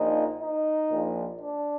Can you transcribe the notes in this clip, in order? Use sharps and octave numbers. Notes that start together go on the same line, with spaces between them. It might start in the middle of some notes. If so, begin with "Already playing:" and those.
Already playing: A#1 A#2 F3 D#4
D#4
A#1 A#2 F3
D4